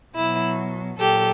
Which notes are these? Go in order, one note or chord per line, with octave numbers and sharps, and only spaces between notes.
B2 F#3 E4
A#2 F#3 G4 A4